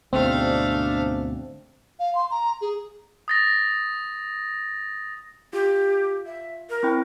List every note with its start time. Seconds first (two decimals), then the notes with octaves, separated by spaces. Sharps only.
0.13 D2 G#2 B2 A3 C4 D4 F5
1.99 F5
2.15 C6
2.31 A#5
2.61 G#4
3.28 D#6 A6 A#6
5.53 F4 G4
6.26 E5
6.70 A#4
6.83 C4 E4 G5